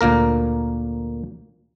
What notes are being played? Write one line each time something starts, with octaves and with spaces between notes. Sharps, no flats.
D2 A#2 A#3 A#4